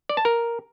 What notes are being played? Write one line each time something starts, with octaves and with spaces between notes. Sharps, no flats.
D5
A5
A#4